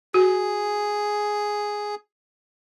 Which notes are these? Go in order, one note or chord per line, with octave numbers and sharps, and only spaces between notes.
F#4 G#4